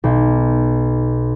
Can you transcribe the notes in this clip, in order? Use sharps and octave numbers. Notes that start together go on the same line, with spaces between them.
B1